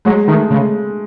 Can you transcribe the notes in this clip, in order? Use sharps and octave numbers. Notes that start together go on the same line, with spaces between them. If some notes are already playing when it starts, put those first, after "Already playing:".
F#3 G#3
D#3 A3
C#3 G#3